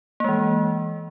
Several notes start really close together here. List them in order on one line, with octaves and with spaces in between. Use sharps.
A#3 G#3 E3